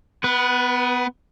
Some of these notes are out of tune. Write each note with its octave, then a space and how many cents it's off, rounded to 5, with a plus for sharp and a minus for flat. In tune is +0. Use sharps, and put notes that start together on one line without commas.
B3 +15 B4 -20